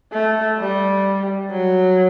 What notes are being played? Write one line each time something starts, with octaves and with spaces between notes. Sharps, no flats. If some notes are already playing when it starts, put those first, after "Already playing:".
A3
G3
F#3